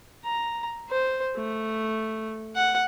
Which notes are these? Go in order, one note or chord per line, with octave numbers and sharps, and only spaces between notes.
A#5
C5
A3
F#5